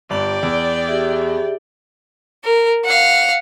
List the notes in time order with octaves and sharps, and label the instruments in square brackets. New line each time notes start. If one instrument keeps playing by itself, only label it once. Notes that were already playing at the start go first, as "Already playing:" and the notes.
[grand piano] G1 G2 F#7 [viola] D5 G5
[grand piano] E2
[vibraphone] G4 G#4 E5
[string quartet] A#4
F5 F#5